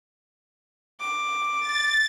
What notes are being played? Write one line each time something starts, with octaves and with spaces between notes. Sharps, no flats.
D6
A6